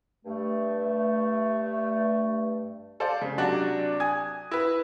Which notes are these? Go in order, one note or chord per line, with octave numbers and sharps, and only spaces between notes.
G2 A3
A4 C5 D5 F5
C#3
C3 F#3 D4 D5 F#5 F#6
G#5 D#6 G#6
E4 B4